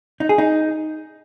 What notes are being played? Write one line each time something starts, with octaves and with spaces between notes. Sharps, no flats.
D#4
G#4
D#4